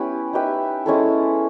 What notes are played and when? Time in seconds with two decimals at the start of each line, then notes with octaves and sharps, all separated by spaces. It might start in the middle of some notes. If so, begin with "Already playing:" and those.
Already playing: B3 C#4 E4 G4 B4
0.33 D#4 G4 B4 E5
0.86 G#3 C#4 E4 A4